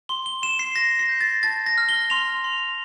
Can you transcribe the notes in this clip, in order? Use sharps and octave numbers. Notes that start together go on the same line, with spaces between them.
C6 G7
G7
C6 E7
C7
C6 A#6
C7
G6
A6
A5 A6
A#6
F6
G7
C6 F7
C6